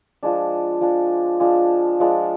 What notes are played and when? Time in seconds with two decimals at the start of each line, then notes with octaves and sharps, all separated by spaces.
0.23 F3 G#3 D4
0.81 F3 G#3 D4
1.40 F3 G#3 D4
2.00 F3 G#3 D4